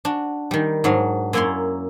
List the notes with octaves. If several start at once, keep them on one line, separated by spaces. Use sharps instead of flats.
D4 F#4
D#3 G3
G#2 F#3 D4 F5
F#2 A#3 E4 C#5 D5 C6